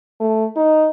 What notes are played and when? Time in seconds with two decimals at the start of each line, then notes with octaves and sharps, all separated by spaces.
0.20 A3
0.56 D#4